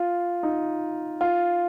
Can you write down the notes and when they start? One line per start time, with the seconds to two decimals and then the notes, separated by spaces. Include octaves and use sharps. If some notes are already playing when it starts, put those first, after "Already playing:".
Already playing: F4
0.43 D#4
1.21 F4